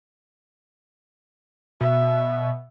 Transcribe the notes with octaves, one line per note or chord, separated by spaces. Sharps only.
B2 E5